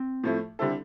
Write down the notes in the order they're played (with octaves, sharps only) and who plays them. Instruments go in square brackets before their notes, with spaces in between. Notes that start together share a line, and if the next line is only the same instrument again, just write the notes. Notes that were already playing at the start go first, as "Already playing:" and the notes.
Already playing: [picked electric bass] C4
[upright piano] A2 F3 A3
D3 G3 C4 E4 A4